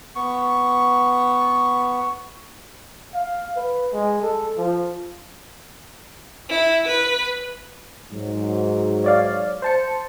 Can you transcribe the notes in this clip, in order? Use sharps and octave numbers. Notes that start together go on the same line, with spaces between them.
B3 C#6
F5
B4
G#3
A4
F3
E4
B4
G#2 F#3
C#5 D5 F5
C5 A5 C#7